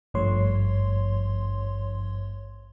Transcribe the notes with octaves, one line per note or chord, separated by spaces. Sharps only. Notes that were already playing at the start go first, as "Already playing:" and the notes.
G#1 G2 F3 A3 C#5 C6